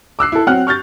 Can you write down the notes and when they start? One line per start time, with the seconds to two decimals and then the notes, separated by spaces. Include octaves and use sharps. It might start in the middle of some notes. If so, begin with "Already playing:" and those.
0.19 D6 E6 F#6 C7
0.32 E4 A4
0.47 F#3 C4 F#5 F6 F#6
0.67 C#6 F6 G6 A6